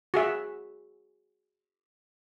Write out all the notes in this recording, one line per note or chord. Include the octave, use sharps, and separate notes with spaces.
F#4 G#4 E5